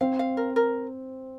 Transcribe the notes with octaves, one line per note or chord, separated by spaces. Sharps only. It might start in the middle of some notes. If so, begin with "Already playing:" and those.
C4 F5
F5
A#4
A#4